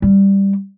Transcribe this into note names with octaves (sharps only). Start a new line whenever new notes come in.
G3